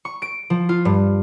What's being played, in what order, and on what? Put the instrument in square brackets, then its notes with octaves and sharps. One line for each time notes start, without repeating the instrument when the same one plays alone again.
[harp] C#6
D7
F3
F4
G2